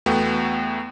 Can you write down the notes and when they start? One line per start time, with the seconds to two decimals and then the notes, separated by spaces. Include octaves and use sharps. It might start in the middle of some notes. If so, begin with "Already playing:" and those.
0.06 E2 A3 B3 F#4 G5